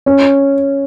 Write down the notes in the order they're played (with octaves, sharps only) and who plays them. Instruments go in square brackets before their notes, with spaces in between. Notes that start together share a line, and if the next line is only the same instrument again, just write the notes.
[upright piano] C#4